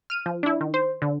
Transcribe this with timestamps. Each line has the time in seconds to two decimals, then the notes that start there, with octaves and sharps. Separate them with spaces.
0.10 F6 D#7
0.26 F3
0.43 D4 E4
0.61 D#3
0.74 C5
1.02 D3